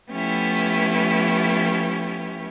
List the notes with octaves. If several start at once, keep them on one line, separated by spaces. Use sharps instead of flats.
F3 A3 B3 C#4 E4 G4